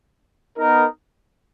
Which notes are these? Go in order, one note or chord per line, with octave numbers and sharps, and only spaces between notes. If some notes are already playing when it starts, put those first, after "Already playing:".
B3 D#4 A#4